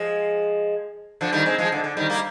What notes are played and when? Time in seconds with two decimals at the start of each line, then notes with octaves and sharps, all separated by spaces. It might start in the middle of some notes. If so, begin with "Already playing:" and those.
Already playing: F3 G#3
1.21 D3 F3
1.32 D#3 G3
1.46 G#3 C4
1.58 F3 G#3
1.72 D3
1.84 D3
1.97 D#3 G3
2.09 G3 A#3